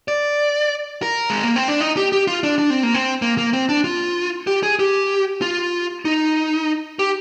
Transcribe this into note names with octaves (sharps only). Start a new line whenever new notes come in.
D5
A#4
G#3
A#3
C4
D4
D#4
G4
G4
F4
D4
D4
C4
A#3
C4
A#3
A#3
C4
D4
F4
G4
G#4
G4
F4
D#4
G4